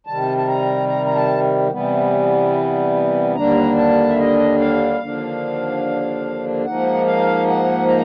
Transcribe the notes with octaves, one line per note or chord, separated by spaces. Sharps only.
C3 D#3 G3 A5
A5
A#5
A#5
A#5
A5
C3 E3 G3 B3
D#2 D3 G3 A#3 D4 A#5
A5
E5
D#5
F5
D#2 D3 F3 A#3 D4
G#2 F3 A#3 D#4 F#5
F5
F#5
A#5